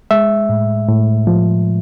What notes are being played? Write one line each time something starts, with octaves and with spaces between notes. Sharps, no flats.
G#3 E5
A2
A2
F3